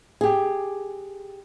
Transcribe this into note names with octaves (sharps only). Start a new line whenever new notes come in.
G4 G#4